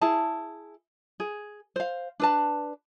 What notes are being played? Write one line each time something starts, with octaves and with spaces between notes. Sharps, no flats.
E4 G#4 A5
G#4
C5 F5
D4 B4 A5